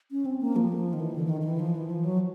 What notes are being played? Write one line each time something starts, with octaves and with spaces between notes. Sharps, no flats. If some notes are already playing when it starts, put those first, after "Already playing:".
C#4
C4
A#3
F3
D#3
E3
D3
E3
D#3
D#3
E3
F3
E3
F3
F#3